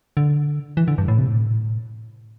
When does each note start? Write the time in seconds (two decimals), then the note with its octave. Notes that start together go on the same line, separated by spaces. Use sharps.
0.17 D3
0.77 E3
0.88 D3
0.98 G2
1.08 A2
1.18 C3
1.28 A2